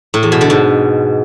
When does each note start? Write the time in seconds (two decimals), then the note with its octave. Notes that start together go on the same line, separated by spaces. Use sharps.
0.14 A2
0.23 E2
0.32 B2
0.41 D3
0.50 G#2